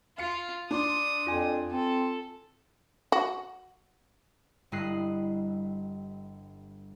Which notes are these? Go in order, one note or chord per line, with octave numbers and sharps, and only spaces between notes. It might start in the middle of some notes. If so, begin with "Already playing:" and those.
F4 F5 C#7
D4 D5 C6 D#6
F2 F4 G#5
C4 A4
F#4
G1 G2 E4 D#5 F#6 C7